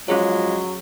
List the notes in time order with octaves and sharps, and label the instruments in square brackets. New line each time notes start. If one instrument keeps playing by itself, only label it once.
[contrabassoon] F3 [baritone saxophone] F#3 [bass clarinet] G#3 [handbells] C#4 G#4 C#5